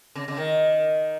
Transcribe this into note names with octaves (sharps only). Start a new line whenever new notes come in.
C#3
C#3
D#3